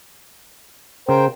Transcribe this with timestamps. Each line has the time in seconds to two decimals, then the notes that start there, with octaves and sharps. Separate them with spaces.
1.09 C#3 A#4 C5 G5